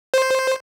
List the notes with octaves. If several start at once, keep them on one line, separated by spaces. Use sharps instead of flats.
C5